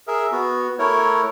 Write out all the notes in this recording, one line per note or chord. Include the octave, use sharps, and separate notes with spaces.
G#4 A#4 E5
B3 F#4
A3 E4 A#4 C#5